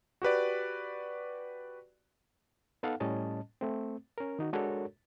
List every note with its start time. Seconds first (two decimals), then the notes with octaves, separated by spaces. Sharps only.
0.22 F#4 G4 B4 D5
2.83 B3 D#4 A4 F5 F#5
3.00 A2 G3 C#4 D#5 A5
3.61 A3 C4
4.18 C#4 A#4
4.39 D#3 D#4 F#4
4.53 G#3 D4 F#4 A4 A#4 C#5